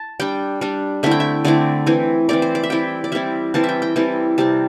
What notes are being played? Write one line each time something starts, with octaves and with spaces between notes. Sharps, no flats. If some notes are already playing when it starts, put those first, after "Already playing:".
Already playing: A5
G3 D4 G5
G3 D4
D3 A3 C4 E4 E5
G5
E5
D3 A3 C4 E4 D5
E3 C4 E4
E3 C4 E4 D5
C5
D5
E5
G3 C4 E4 G5
D5
G3 C4 E4 E5
E3 G3 C4 E4 A5
E5
G5
G5
E3 G3 C4 E4 A5
C3 G3 C4 A5